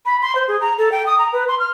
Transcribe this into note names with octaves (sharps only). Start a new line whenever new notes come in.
B5
C6
C5
G#4
A#5
A4
G5
D#6
A#5
B4
C6
F6